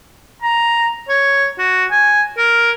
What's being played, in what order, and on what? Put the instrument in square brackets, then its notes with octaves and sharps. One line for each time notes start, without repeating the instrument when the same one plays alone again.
[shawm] A#5
C#5
F#4
G#5
A#4